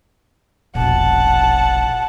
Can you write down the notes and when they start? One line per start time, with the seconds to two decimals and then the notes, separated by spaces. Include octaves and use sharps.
0.75 E1 A#1 F#5 A5